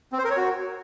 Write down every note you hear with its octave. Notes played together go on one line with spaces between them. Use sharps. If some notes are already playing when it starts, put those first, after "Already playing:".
C4
C5
A#4
C#5
F#4